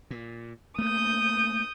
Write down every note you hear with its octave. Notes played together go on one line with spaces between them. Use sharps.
A#2
A3 A#3 D#6 G6